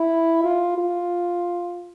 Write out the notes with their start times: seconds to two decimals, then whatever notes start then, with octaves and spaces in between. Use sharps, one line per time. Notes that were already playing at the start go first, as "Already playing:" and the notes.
Already playing: E4
0.44 F4
0.78 F4